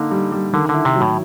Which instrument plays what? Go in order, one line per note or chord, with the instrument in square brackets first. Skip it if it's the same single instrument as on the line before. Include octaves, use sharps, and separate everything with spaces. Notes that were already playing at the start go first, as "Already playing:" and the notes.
Already playing: [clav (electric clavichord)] D3 [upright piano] A#3 D#4
[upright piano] G3
G3
[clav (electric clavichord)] D3 [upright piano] D#3
[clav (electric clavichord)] D3 [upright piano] E4
[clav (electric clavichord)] C3
[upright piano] F#3
[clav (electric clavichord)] A2